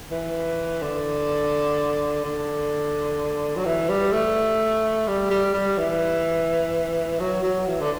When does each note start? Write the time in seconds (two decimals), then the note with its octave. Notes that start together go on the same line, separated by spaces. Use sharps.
0.11 E3
0.82 D3
2.24 D3
3.56 F#3
3.65 E3
3.89 G3
4.12 A3
5.07 G3
5.30 G3
5.54 G3
5.78 E3
7.20 F#3
7.43 F#3
7.67 E3
7.81 D3